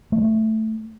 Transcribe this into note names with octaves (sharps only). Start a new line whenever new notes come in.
A3